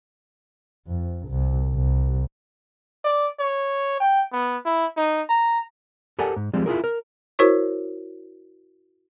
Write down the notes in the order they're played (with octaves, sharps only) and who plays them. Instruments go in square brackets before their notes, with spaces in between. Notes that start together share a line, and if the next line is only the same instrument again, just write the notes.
[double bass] F2
C2
C2
[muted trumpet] D5
C#5
G5
B3
E4
D#4
A#5
[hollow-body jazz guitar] G4 A4 A#4 D5 F#5 G#5
G#2
F3 G3 G#3 C4
E4 F4 G#4 A#4
A#4
[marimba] E4 F#4 A#4 C5 C#5 C#6